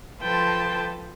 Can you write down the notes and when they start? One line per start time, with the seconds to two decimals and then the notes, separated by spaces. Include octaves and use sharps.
0.22 F3 A4 B4 G5 A5 C6